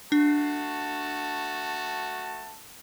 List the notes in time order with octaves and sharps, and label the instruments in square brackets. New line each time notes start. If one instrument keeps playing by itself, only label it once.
[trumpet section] A3 F#4 A5 [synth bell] D4